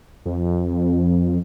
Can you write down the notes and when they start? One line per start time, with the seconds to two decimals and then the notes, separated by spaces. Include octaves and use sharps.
0.26 F2